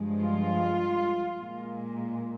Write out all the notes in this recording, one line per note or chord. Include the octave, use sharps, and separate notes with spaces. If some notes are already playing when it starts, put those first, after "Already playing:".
Already playing: G2 F3 G#3
F4
A#2 G#3